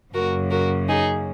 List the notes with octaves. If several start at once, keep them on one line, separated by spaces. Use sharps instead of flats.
F#2 C#3 A#3 F#4 A#4
F#4 A#4
D#4 G#4